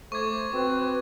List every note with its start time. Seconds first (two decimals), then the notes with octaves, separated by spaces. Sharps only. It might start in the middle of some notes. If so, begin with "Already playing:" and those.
0.12 A3 C5 C#6 D6 G#6
0.53 C4 F#4 B4